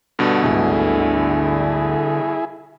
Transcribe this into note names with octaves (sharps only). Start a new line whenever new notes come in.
G2 B2 D3
G#1 D2 E4 G#4